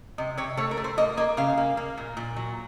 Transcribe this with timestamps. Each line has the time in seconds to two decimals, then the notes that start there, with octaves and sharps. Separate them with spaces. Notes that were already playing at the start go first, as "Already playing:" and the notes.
0.18 C3 D#5
0.37 C3 C#5
0.57 A3 C#5
0.71 A#4
0.77 A3
0.84 C5
0.98 A#3 D#5
1.17 A#3 D#5
1.37 C#3 F5
1.58 A#3
1.77 A#3
1.97 A#2
2.17 A#2
2.36 F#3